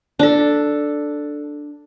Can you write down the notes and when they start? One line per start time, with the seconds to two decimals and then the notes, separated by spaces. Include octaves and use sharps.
0.19 D4 A4